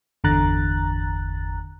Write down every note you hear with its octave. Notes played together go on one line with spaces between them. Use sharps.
G1 E2 D3 A#5 F#6 A6